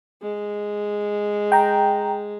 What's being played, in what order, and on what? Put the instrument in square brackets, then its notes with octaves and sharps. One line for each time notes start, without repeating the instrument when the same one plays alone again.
[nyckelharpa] G#3
[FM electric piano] G5 A#5